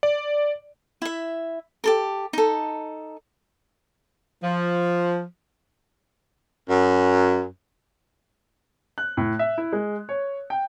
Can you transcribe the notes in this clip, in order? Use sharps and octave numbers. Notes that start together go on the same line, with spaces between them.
D5
E4 E5
G4 A4 A#4
D#4 A4
F3
F#2
F#6
A2
E5
E4
G#3
C#5
G5